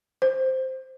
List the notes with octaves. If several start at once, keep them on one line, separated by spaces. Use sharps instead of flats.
C5